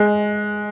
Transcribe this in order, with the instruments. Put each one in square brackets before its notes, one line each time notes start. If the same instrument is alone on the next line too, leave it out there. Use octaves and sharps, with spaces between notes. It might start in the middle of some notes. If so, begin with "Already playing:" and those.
Already playing: [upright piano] G#3